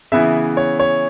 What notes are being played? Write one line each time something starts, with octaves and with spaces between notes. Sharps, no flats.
C#3 E3 B3 E4 E5
C#5
C#5